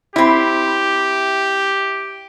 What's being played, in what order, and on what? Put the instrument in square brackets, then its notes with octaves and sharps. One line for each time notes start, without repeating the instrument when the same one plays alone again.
[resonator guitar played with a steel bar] C4 E4 [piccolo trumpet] G4